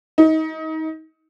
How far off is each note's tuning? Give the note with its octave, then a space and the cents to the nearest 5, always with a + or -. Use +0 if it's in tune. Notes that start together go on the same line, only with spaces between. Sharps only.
D#4 +25